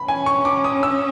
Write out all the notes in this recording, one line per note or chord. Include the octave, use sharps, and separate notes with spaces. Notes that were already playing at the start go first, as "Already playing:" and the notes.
Already playing: B5
C#4 G#5
C#6
D6
D#6
E6